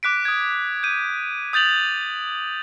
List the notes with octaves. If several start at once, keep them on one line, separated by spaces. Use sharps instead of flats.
D6 F#6 B6 D7
D#6 G#6
G6 D#7
D#6 G6 A6 F7 F#7